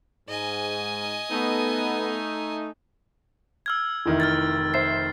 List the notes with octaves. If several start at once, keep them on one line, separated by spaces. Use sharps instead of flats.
G#2 D#5 G#5
A3 B3 D#4 A4
E6 F6 G#6
F1 D#3 E3 E4
F6 G#6 A6
C5 E5 C7